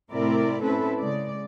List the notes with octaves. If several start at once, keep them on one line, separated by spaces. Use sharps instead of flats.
A2 C3 C4 E4 A#4 D5
C4 C#4 E4 A4 B4
C#3 G#3 D5